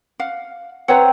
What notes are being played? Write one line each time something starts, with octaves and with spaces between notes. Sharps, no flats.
F5 F#5
C4 B4 C#5 F#5 A#5